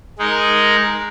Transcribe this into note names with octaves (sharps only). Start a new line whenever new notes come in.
G#3 D#4 A#4